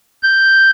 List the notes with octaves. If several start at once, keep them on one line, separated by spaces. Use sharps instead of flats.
G6